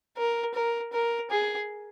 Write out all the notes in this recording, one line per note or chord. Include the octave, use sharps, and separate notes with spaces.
A#4
A#4
A#4
G#4